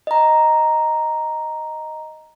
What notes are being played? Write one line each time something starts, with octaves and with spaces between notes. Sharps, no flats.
D#5 A#5